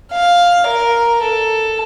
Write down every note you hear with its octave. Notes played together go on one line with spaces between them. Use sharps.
F5
A#4
A4